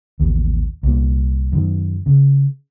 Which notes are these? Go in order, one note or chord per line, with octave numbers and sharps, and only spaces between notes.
A1 D#2
C2 A#2
F#2 D#3
C#3